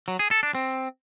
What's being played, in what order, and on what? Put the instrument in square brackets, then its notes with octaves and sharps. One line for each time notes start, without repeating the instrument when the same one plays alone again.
[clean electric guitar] F#3
G#4
A4
D4
C4